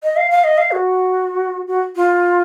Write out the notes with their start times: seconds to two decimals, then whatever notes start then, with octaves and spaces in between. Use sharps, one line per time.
0.03 D#5
0.16 F5
0.31 F5
0.44 D#5
0.58 F5
0.71 F#4
1.67 F#4
1.96 F4